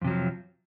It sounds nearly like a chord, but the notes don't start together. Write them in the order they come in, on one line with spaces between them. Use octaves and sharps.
F2 C3 F#3 F3